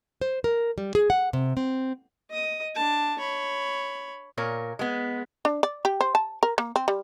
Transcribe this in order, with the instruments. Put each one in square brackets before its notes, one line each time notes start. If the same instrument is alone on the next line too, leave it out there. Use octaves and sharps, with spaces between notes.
[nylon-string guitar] C5
A#4
G3
G#4
F#5
C3
C4
[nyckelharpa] D#5 D#6
D4 A5
C#5 B5
[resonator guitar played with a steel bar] A#2 A#4 C#5
G#3 B3
[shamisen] D4
D5
G4
C5
A5
A#4
A#3
C4
G3